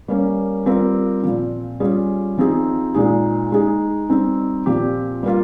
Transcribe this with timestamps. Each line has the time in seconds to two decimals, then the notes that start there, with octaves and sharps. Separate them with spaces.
0.08 G3 A#3 C#4
0.66 G3 C4 F4 A#4
1.23 A#2 F3 C4
1.80 G3 C#4 F4 G#4
2.38 F3 C4 D#4 G#4
2.94 A#2 G#3 D#4 G#4
3.52 G#3 D#4 G#4
4.09 G3 C4 D#4
4.66 A#2 F3 C4 G4
5.23 G3 A#3 F4